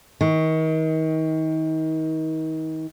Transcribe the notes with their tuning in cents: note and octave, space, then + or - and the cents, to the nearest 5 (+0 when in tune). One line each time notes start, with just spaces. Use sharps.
D#3 +35